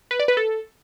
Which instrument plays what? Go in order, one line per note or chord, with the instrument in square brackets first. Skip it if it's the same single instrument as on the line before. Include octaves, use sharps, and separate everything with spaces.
[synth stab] B4
D5
B4
A4